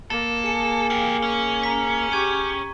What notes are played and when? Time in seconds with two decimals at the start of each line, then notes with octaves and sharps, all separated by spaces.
0.10 A#3 A4 A6
0.46 G#4 C#7
0.90 F4 G4 C#7 G7
1.22 C#4
1.63 A#5 B6
2.12 G4 C#6 G#6 D#7